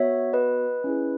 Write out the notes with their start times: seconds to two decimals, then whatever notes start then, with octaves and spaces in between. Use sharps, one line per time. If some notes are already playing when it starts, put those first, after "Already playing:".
Already playing: B3 F#4 C#5 E5
0.33 B4 D#5
0.84 C#4 E4 G#4